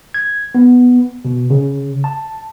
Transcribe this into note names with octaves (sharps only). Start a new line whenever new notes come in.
G#6
B3
B2
C#3
A5